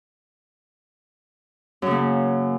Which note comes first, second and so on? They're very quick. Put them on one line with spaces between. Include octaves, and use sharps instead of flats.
F#2 C#3 A#3